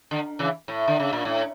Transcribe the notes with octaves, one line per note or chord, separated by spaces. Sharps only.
D3
C#3 E3
A2
D3
C#3
A#2
A2